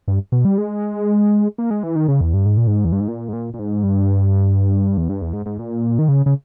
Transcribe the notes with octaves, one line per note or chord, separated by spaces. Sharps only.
G2
B2
G3
G#3
A#3
G#3
E3
D#3
C#3
E2
G2
G#2
A#2
G#2
E2
G2
G#2
A#2
G#2
A#2
A#2
G#2
G2
E2
G2
E2
G#2
G#2
A#2
D#3
C#3
C#3